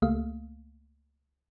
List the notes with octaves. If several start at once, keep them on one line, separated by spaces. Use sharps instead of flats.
C#2 A3 A#3 F5